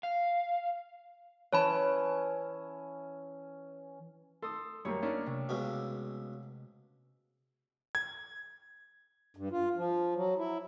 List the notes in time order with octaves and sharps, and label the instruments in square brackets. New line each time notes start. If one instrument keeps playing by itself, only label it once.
[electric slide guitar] F5
[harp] E3 [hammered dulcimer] C#4 [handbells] C#5 A5 B5
[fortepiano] A4 [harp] C6 D#6
[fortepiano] F#2 G3 A#3 [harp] A3 C#5
[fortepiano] A#3 C#4 D4
[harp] C3
[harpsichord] C#2 B2
[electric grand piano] G#6
[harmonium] G2
F4
F3
F#3
E4